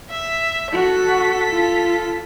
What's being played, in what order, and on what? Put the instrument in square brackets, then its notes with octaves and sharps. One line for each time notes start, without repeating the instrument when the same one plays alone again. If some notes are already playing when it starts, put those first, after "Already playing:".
[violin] E5
[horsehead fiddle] F#4 [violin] A4 B6
[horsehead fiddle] F4